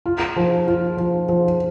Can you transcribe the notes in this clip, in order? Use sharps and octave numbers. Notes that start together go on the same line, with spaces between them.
F4
F3
F4
F3
F3